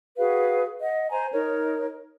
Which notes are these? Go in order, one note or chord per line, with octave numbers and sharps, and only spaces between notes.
F#4 G#4 B4 F5
D#5 F#5
C5 G#5 A#5 C6
D#4 A#4 C#5